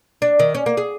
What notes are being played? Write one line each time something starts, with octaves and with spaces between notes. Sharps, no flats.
D4
D#3
C#4
A#3
G#4